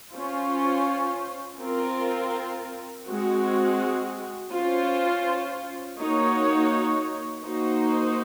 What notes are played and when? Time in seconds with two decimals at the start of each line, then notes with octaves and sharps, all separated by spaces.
0.13 C#4 F4 C5
1.59 C4 F4 A#4
3.06 G#3 C4 F#4
4.52 C#4 F4 C5
5.97 A#3 D#4 F#4 C#5
7.44 A#3 D#4 F#4 C5